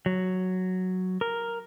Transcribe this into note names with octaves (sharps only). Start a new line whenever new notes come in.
F#3
A#4